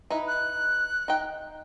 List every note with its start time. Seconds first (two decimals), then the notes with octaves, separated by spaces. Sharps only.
0.10 D#4 E4 B4
0.28 F#6
1.08 D#4 G5